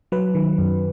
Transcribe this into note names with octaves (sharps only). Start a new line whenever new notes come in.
F#3 B4
D#3
F#2